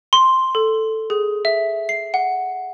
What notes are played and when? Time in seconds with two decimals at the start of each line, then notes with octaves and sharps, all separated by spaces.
0.13 C6
0.55 A4
1.10 G#4
1.45 E5
1.89 C7
2.14 F#5